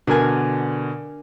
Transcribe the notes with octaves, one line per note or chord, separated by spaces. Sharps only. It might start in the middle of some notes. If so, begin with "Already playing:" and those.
B2 D3 D4 A#4 G#5